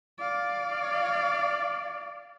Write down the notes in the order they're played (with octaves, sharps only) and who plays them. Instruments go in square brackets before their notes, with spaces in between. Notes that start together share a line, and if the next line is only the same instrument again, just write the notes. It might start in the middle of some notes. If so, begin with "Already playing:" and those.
[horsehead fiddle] D5 F5